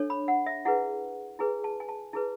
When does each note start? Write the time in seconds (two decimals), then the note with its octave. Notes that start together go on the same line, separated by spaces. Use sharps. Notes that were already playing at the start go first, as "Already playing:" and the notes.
Already playing: D4 A4 C#5
0.10 B5
0.28 F#5
0.46 E5
0.65 E4 G#4 B4 F#5
1.39 E4 G#4 B4 G#5
1.64 A5
1.80 G#5
1.89 A5
2.13 E4 G#4 B4 A5